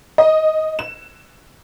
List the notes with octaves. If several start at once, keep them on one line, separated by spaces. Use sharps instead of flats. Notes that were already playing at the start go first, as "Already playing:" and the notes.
D#5
E7